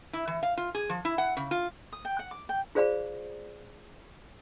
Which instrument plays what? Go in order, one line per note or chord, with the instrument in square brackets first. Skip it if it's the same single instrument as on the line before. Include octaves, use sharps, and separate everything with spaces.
[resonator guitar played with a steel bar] E4
E3
F5
F4
G#4
F3
E4
F#5
C#3
F4
[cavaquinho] D#6
G5
F#5
D6
G5
[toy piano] F4 G#4 C5 D5 F5 B5